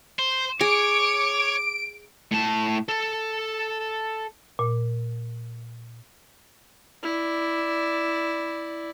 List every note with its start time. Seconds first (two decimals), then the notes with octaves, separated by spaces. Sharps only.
0.19 C5
0.61 G#4 C#5 D6 D7
2.31 A2 A5
2.88 A4
4.59 A#2
7.03 E4 D5